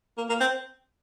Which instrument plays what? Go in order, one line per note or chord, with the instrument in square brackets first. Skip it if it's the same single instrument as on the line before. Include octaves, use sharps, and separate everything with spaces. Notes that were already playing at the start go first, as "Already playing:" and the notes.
[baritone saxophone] A#3
A#3
C4